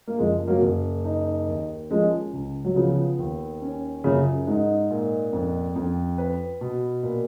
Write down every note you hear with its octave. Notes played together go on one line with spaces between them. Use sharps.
A#3
F#1 F3 G#3
F#3 A#3
F#1
D#4
D#2
F3 G#3 C#4
C#2
F#3
C#3 F3 B3
D#2
C#4
F#2 A#2 C#3
G#2 D#4
A#2
F2
F2
B4
B2
A#2